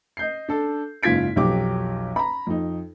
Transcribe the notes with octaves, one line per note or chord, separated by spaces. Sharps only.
D#5 G6 C7
D4 A4
F#1 G#2 F4 G#6 B6 D7
B1 F2 F#3 G4 D6
A#5 B5
F2 D#4